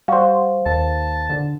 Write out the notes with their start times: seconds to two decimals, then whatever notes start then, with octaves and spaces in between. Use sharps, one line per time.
0.08 G3 F#4 C5 F5
0.66 D#2 A5
1.30 D3